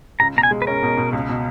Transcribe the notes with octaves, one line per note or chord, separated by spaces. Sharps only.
C#2 A#5
B2 A#5
G#5
G#3
B4
C#4 A#4
B2
B2
C#2
B2